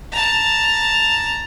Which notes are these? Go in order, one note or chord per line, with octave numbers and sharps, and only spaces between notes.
A5 A#5